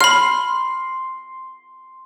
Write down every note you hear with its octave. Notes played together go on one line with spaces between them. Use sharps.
B5 C6 F6